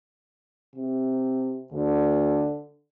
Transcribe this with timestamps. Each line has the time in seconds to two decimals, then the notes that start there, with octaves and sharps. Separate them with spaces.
0.75 C3
1.73 D2 D3